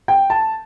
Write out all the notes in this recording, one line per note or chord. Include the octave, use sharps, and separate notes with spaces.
G5
A5